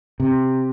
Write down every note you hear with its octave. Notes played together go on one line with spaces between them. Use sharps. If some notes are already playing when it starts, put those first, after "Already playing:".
C3